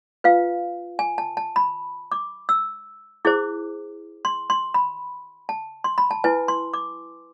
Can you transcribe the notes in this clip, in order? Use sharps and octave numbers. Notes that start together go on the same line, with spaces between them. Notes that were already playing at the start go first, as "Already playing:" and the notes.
F4 B4 F5
G#5
A5
A5
B5
D6
E6
E4 G#4 C5 D6
C6
C6
B5
A5
C6
B5
A5
E4 B4 G#5
C6
D6